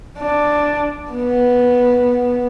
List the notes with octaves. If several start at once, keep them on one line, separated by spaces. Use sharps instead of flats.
D4
B3